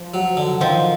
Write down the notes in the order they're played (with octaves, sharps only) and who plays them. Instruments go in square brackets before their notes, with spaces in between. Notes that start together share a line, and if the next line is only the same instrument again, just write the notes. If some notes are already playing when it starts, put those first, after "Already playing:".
Already playing: [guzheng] F3
[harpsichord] F#3
D3
[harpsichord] D#3 [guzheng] F3